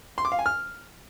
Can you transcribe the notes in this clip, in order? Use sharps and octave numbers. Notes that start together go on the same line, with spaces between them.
C6
D6
F5
G#5
F6